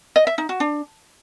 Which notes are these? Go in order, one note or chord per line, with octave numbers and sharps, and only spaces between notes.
D#5
E5
D#4
F#4
D4